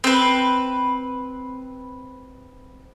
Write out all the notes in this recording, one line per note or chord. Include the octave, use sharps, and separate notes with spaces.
C4 B4